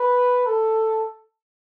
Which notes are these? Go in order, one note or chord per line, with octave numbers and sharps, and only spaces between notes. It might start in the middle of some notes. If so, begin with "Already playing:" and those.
Already playing: B4
A4